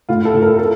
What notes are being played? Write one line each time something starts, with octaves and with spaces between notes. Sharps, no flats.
A2 F4
A4
A2
A#4
A4